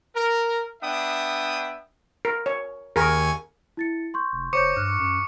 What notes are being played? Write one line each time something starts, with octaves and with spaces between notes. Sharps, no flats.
A#4
B3 D4 E5 G5 D#6
A#4
C#5
D#2 G#4 A#4 G#5 C#6
E4 A6 C#7
C6 C#6 G6
F1
F#1 C5 C#5 C#6 D6 G6 C#7
G2 F6 F#6
F#2